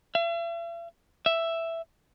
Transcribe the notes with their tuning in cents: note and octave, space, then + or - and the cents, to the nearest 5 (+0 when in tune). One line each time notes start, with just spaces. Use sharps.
E5 +45
E5 +5